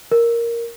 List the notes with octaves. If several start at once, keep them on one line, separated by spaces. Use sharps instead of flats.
A#4